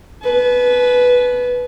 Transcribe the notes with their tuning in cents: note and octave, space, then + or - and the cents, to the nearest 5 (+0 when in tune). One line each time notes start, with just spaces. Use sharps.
B4 +0 A5 -45